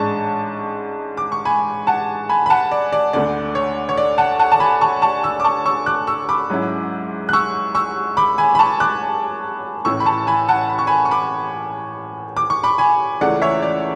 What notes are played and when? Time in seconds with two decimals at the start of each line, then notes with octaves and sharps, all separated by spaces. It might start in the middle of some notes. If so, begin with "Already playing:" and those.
Already playing: A1 G#2 G#3 D4 A5 C#6
1.17 D6
1.32 C#6
1.45 G#5 B5
1.87 F#5 A5
2.29 G#5 B5
2.46 B5
2.50 F#5 A5
2.71 D5
2.92 D5
3.13 D2 D3 A3 D5
3.55 C#5
3.89 C#5
3.97 D5
4.18 F#5 A5
4.39 F#5 A5
4.52 A5
4.60 G#5 B5
4.81 A5 C#6
5.02 A5 C#6
5.23 C#6 E6
5.40 D6
5.44 A5 C#6
5.66 C#6 E6
5.86 D6 F#6
6.07 C#6 E6
6.29 B5 D6
6.50 G#2 F#3 C#4 E4
7.29 F#6
7.33 C#6 E6
7.75 C#6 E6
8.17 B5 D6
8.38 G#5 B5
8.55 B5
8.59 A5 C#6
8.80 D6 F#6
9.85 A1 A2 E3 C#6 E6
10.00 B5
10.06 A5 C#6
10.27 G#5 B5
10.48 F#5 A5
10.69 B5
10.78 C#6
10.87 G#5 B5
11.05 C#6
11.11 B5 D6
12.37 D6
12.50 C#6
12.64 B5 D6
12.78 G#5 B5
13.21 C#2 C#3 E3 A3 D5 F#5
13.42 C#5 E5
13.62 D5